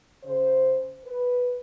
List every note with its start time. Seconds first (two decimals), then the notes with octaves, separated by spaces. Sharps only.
0.24 C#3 C5
1.05 B4